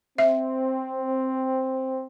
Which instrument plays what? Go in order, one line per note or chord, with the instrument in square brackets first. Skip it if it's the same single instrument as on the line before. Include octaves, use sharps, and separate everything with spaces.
[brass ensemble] C4 [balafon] E5